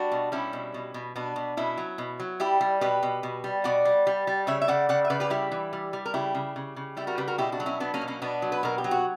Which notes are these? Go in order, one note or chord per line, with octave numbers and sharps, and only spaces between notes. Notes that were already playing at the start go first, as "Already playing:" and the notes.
Already playing: G3 D4 F#4
B2
G3 C#4 E4
B2
B2
B2
B2 B3 D4
B2
B2 C#4 E4
F#3
B2
F#3
G3 E4 G4
G3
B2 G4 B4
B2
B2
G3
B2 D5 F#5
G3
G3
G3
C#3 C#5 E5
E5
C#3 D5 F#5
C#3 D5 F#5
E5
C#3 B4 D5
G4 B4
G3 E4 G4
E3
G3
G3
A#4
C#3 E4 G4
C#3
C#3
C#3
G3 E4 G4
F#4 A#4
C#3 G4 B4
F#4 A#4
B2 E4 G4
D4 F#4
F#3
C#4 E4
F#3 B3 D4
A#3 C#4
B2
A#3 C#4
B2 B3 D4
F#3
B4
B2 A#4
G4
F#3
F#4